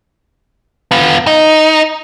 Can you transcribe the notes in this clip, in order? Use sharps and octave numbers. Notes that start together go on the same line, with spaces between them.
B3 F4
D#4